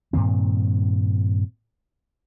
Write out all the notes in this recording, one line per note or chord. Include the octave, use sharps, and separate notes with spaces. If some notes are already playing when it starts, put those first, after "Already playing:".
G2 A#2 D#3 C4